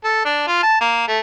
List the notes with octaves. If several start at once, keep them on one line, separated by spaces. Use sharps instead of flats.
A4
D4
F4
A5
A#3
A3